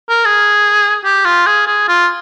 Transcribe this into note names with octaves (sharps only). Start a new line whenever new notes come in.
A#4
G#4
G4
F4
G#4
G#4
F4